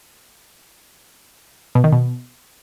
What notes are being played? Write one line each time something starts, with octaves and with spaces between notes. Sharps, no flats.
B2
D#3
B2